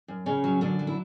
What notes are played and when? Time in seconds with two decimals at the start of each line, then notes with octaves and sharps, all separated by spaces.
0.08 F#2
0.26 F#2 C#3 C#4
0.44 F#3
0.61 F#2 D3 D4
0.79 F#3
0.87 E4